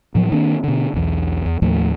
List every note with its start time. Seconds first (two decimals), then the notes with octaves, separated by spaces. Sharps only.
0.15 A2 F3 F#3
0.32 D#3 A#3 C4 D4
0.64 B2 D3
0.94 B1 E2
1.46 E2
1.62 D#2 A2 F3 A3